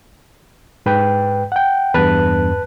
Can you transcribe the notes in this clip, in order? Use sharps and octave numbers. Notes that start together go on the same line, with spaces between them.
G#2 B4 G5
F#5 G5
E2 G2 B4 A5 F#6